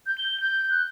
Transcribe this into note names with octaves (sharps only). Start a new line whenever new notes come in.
G6
G7
G6
F#6